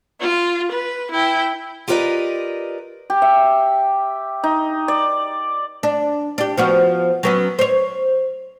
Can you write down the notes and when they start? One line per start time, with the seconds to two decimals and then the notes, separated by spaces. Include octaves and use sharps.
0.21 F4
0.72 B4
1.11 E4 G5
1.88 F4 G4 A#4 B4 D5 D#5
3.10 G4
3.22 E5
4.44 D#4
4.88 D5
5.83 D4
6.38 D4 G4
6.57 F3 B3 F#4
7.23 F#3 B3 C#4
7.59 C5 C#5